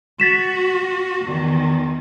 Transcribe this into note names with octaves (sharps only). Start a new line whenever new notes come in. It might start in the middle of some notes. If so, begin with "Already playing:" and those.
F#4 A6 B6 E7
E2 D#3